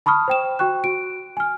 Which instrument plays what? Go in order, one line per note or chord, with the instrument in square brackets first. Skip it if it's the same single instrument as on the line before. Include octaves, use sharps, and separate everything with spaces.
[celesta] A5 B5 C#6 D#6 F6
C5 G5 E7
F#4 G5 C#6 F#6
F#4 D7
G#5 F6